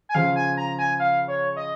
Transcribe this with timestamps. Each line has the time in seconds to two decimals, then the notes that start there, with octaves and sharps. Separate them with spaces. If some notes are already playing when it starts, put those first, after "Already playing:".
0.09 G#5
0.15 C#3 F3 F5
0.36 G#5
0.57 A#5
0.78 G#5
1.00 F5
1.28 C#5
1.56 D#5